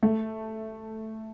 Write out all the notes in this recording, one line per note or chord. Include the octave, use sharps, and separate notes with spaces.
A3